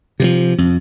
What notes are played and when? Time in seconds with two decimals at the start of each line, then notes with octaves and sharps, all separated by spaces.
0.20 C3 D#3 F3
0.58 F2